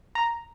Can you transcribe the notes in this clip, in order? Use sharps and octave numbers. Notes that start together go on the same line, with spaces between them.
A#5